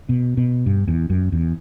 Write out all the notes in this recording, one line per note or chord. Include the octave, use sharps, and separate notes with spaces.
B2
B2
G2
E2
F#2
E2